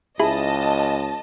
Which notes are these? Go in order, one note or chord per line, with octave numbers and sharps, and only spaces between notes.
C#2 E4 G#4 D#5 A5 B5